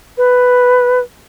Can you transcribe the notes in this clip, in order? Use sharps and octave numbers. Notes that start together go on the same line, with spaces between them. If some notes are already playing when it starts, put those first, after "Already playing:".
B4